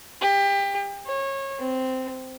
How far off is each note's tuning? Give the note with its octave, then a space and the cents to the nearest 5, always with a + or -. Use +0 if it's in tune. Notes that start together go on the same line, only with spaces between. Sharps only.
G4 +25
C#5 -25
C4 -10